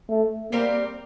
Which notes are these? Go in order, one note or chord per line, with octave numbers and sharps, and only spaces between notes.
A3
G3 A#3 C4 G4 A#4